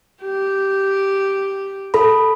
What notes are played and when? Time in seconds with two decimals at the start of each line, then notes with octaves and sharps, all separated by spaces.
0.22 G4
1.94 A4 B5